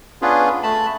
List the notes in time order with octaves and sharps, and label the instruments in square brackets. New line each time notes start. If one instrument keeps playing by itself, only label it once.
[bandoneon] B3 C#4 D4 F4 G#4 B4
A3 A5 B5